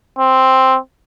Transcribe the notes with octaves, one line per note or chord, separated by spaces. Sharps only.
C4